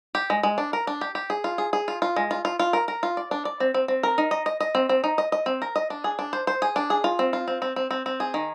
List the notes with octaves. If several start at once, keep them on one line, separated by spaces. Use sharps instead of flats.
G4
G#3
G#3
D4
A#4
D4
G4
G4
G#4
F4
G#4
G#4
F4
F4
G#3
F4
F4
F4
A#4
A#4
F4
D5
D4
D5
C4
C4
C4
A#4
D#4
D#5
D#5
D#5
C4
C4
D#4
D#5
D#5
C4
A#4
D#5
D4
G#4
D4
C5
C5
G#4
D4
G#4
F4
C4
F4
C4
C4
C4
C4
C4
G#4
D#3